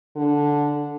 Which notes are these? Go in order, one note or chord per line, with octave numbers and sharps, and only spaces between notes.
D3